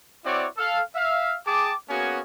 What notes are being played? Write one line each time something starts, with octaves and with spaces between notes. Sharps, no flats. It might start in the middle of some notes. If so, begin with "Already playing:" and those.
C4 E4 F#4 C#5 D5
A4 F5
E5 F5
G#4 G5 A5 D6
A#3 B3 C#4 F#4 G#4 G#5